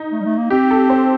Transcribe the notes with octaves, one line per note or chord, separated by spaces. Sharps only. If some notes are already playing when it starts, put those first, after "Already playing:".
Already playing: D#4
A3
G3
A3
A#3
C4 G4
A4
C5